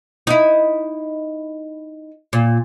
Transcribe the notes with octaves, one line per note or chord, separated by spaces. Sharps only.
D#4 E4
A#2